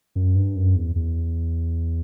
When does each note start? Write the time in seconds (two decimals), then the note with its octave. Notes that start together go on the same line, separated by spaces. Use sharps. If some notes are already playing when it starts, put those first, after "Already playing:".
0.16 F#2
0.35 G2
0.56 F#2
0.76 E2
0.96 E2